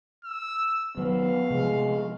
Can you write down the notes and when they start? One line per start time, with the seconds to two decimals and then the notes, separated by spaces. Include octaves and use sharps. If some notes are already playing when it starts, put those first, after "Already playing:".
0.25 E6
0.97 D#3 F#3 B3 F5
1.50 C3 F3 G#3 B3